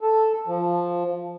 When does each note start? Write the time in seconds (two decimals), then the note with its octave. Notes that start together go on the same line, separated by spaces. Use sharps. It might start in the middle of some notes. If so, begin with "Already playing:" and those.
0.01 A4
0.48 F3